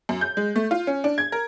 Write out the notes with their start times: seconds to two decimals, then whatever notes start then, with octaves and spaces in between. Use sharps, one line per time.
0.09 F#2
0.21 G6
0.37 G#3
0.56 A3
0.71 F4
0.87 C#4
1.04 D4
1.18 G#6
1.32 A#4